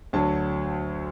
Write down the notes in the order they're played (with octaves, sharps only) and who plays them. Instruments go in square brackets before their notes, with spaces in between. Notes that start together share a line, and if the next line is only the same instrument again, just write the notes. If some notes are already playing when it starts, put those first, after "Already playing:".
[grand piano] D2 D3 F#3 A5